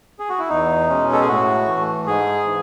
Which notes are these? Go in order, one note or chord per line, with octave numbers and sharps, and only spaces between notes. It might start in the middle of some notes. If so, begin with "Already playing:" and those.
G#4
F#4
E4
E2 D#4
B2 G#3 C#4
A4
G#4
A2 F#4
E3 A3
G#2 G#4
E3